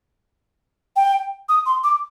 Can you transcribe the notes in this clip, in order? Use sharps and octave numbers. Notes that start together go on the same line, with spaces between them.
G5
D#6
C6
D6